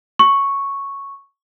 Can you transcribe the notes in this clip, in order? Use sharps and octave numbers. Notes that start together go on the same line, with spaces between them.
C#6